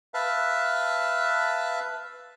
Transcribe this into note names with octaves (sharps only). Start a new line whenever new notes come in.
B4 E5 F5 A5